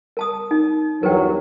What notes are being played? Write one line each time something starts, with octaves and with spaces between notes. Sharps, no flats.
A#4 A5 D#6
D#4
E2 G2 F#3 A#4 B4 G5